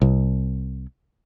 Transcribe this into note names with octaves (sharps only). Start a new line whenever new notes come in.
C2